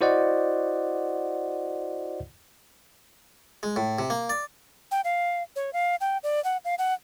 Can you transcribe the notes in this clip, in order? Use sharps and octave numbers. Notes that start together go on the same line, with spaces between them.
E4 F#4 C5 D5 D#5 F#5
G#3
A2
C3
A#3
D5
G5
F5
C#5
F5
G5
D5
F#5
F5
F#5